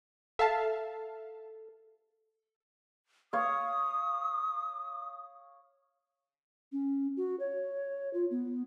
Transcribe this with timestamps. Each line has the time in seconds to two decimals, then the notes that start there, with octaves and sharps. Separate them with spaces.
0.39 A4 E5 F5 A5
3.33 C#5 F5 D#6
6.72 C#4
7.17 F#4
7.39 C#5
8.13 F4
8.31 B3